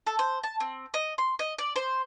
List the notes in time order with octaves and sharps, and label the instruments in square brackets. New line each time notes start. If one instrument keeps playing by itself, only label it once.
[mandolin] A4
C5
A5
C4
D#5
C6
D#5
D5
C5